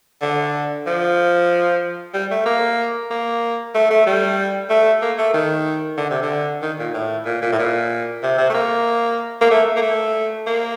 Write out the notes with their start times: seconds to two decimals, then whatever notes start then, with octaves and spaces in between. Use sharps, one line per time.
0.22 D3
0.87 F3
2.14 G3
2.31 A3
2.46 A#3
3.11 A#3
3.75 A3
3.91 A3
4.07 G3
4.70 A3
5.02 A#3
5.18 A3
5.34 D#3
5.98 D3
6.10 C3
6.22 D3
6.62 D#3
6.79 A#2
6.94 A2
7.26 A#2
7.42 A#2
7.52 A2
7.59 A#2
8.23 C3
8.38 C3
8.50 A3
8.54 A#3
9.41 A#3
9.51 A3
9.77 A#3
9.82 A3
10.47 A#3